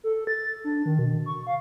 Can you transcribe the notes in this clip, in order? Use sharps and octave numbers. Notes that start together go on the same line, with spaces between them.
A4
A6
D4
D#3
B2
C#6
F5